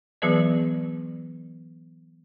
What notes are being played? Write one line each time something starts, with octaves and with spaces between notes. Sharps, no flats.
E3 F#3 B3 G#4 B4 D5